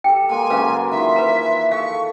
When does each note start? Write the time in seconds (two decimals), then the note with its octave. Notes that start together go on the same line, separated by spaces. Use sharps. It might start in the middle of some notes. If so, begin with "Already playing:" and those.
0.04 G4 A4 G5
0.29 G#3 A#3 G#5
0.50 C#3 F#3 G#3 B4 F5
0.91 D#3 E3 F4 E5
1.16 B4 A#5
1.71 G#4 A4 F5 C#6